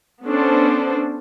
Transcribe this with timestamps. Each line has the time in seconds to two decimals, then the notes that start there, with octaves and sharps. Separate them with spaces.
0.25 B3 C#4 D4 A4 C5